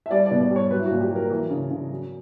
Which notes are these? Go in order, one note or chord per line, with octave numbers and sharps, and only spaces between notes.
E5
G3 D5
D5
B2
D5
G3 C#5
F#3 B4
E4
F#4
A#2
G4
F#3
A#4
E3
C#3
C#3
F#3